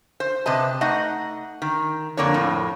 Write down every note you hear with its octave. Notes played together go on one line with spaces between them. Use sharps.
C5
C3 B4 D#5 A5
A3 D#4 D#5 F#5
D#3
F2 D3 A#3 D4 C#5
F2 A2